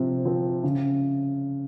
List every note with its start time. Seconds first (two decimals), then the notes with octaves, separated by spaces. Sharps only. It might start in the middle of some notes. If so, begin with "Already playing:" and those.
Already playing: C3 F3 C4
0.25 F3 C4
0.63 C#3